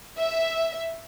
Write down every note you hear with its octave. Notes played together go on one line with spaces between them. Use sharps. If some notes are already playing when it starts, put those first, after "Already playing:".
E5